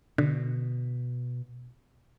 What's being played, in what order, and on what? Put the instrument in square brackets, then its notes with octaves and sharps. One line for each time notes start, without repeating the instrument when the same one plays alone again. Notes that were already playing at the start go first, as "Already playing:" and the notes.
[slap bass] B2 [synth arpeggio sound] D3